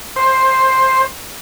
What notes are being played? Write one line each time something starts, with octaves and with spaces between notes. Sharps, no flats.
C5